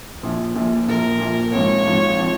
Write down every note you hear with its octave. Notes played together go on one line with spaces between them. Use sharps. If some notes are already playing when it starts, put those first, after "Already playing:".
A#1 A#2 F3
A#1 A#2 F3
A#1 A#2 F3 A#4
A#1 A#2 F3
G#1 G#2 F3 C4 C#5
G#1 G#2 F3 C4
F3 C4